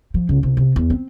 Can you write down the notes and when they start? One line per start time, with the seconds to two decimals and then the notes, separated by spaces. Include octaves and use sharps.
0.14 F3
0.29 C#2
0.43 C2
0.57 C3
0.76 E2
0.90 C4